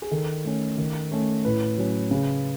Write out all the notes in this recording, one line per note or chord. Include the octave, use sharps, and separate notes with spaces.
G#4
D#3 A4
A3 C#4
D#3
A3 C#4
A2 B4
F#3 C#4
C#3